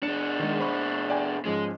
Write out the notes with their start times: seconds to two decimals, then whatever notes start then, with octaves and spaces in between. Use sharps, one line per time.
0.03 B2 D4 C#7
0.40 D#3 G#3
0.60 C5 B5 C#6
1.10 D5 G5 G#5
1.45 G#2 F3 G#3 C#4